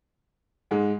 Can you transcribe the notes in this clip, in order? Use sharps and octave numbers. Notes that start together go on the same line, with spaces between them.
G#2 G#3